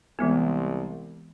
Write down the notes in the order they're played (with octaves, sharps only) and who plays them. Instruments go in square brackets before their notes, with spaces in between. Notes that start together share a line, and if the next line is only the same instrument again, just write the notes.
[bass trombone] C2 [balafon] E3 G#3 B3